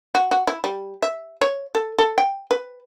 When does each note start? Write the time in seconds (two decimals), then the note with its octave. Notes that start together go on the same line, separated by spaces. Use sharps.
0.15 F#4
0.31 F#4
0.47 E4
0.64 G3
1.02 E5
1.41 C#5
1.75 A4
1.99 A4
2.18 G5
2.51 B4